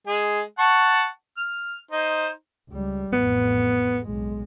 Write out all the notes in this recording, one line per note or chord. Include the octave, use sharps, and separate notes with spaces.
G#3 G#4
F#5 A5 C#6
F6
D#4 C5
C#2 G3
A1 F2 B3
B1 G#3